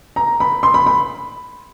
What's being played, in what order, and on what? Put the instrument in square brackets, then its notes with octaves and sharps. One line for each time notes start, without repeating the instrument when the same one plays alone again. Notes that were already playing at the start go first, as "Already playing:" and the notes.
[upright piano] A#5
B5
C6
B5
B5